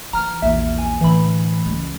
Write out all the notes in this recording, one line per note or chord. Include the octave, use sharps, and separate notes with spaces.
E3 A#5 F6
A#1 E2 E5
G#5
A2 D3 E3 B5
C#2 G#3